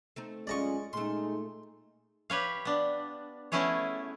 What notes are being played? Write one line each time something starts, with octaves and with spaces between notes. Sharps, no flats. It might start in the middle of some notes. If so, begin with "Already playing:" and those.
A3 C4 D#4
F#2 G#3 C#4 D#4 F4 D5 D#5 C#6
A#2 G#3 A3 D#4 C6
G4 B4 C#5 F5
B3 D4
A3 B3 C#4 E4 G#4 C#5